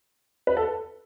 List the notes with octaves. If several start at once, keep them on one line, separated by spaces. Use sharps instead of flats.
B4
A4